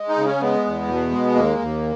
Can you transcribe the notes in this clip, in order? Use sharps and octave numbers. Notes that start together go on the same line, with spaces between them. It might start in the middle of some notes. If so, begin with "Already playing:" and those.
Already playing: G#3
D#4
C#3
C#4
G#3 B3
E2
B2
G#3
D#2 A#3
D#2